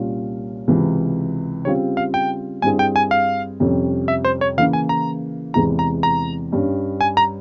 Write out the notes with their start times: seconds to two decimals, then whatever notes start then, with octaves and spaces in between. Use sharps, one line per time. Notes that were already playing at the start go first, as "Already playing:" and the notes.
Already playing: C2 A#2 G3 C#4 F4
0.68 C#2 C3 E3
1.65 C#3 G3 C4 F4 C#5
1.97 F5
2.14 G5
2.62 G2 G3 C4 E4 G#4 G#5
2.79 G5
2.96 G#5
3.11 F5
3.60 F2 C3 G3 C#4
4.08 E5
4.25 C5
4.41 C#5
4.57 C#3 E3 A#3 E4 F5
4.73 G#5
4.89 A#5
5.54 E2 C3 E3 G#3 E4 A#5
5.79 A#5
6.03 A#5
6.52 G2 G3 C#4
7.01 G#5
7.17 A#5